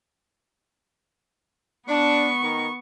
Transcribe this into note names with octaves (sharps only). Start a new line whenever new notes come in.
B3 D4 C#6
D#3 D#4 A#5